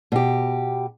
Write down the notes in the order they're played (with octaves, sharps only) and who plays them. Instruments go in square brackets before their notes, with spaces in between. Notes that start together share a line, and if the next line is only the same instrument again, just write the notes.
[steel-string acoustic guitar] B2 G4